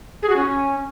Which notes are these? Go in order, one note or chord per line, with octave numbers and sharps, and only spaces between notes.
G#4
F#4
C#4